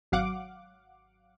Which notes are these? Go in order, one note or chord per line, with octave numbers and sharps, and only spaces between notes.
G#1 F#3 F5 F#5 D6